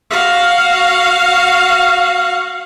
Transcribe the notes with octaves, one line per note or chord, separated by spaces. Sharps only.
F#4 F5